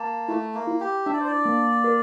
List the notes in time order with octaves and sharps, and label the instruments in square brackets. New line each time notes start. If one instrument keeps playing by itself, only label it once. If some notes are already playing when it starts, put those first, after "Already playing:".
Already playing: [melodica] A#3 [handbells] A5
[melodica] A3 [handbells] E4
[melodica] A#3
[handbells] E4
[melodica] G4
[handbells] D4 [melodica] E5
[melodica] D5
C5
D5
[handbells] A#3
A#4